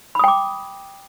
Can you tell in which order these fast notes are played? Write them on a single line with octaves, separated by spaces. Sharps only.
B5 D#6 G5 D6